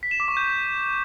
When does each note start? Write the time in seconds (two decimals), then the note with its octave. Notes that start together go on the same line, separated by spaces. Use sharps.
0.03 B6
0.11 E7
0.20 D6
0.28 C#6
0.37 G6